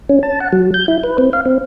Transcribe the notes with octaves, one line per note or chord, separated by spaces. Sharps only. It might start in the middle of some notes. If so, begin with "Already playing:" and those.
C#4
A5
F#5
F#3
G6
E4
B4
C4
F5
C4